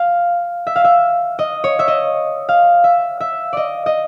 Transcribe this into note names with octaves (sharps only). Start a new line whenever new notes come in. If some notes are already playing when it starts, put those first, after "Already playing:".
Already playing: F5
E5
F5
E5
D#5
C#5
E5
D#5
F5
E5
E5
D5 D#5
D#5